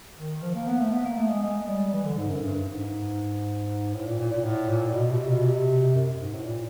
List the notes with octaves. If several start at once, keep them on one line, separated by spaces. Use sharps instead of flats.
D#3
F3
A#3
B3
A3
B3
A#3
A3
G#3
G#3
G3
E3
D3
G#2
F#2
G2
G#2
A2
A#2
A#2
A#2
A2
A#2
A#2
B2
C3
B2
C3
F#2
G#2
A2
A#2